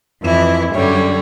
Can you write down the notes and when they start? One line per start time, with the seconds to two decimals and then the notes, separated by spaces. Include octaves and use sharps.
0.22 F2 E3 E4
0.74 F#2 D3 G3 C#5